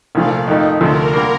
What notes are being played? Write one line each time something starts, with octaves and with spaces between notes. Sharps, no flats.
C2 A#2 F3 A3 D5 F5
F2 D#3 A3 D#4
D2 C3 F3 A3 A#4 D5
D3 G3 A#3